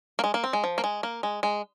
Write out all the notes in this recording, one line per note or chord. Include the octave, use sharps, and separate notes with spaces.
A#3
G#3
A#3
C4
G#3
F3
A#3
G#3
A#3
G#3
G#3